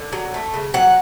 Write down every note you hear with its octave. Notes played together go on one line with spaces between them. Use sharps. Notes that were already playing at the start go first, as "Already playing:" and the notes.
Already playing: D3 D5
F#3
A3
C#3
F#3 F#5